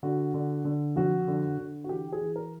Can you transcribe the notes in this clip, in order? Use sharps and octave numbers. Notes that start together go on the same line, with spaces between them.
D3 F#4
D3
D3
F2 F#4
D3
D3
F#4
E3 G4
G#4
E3
A#4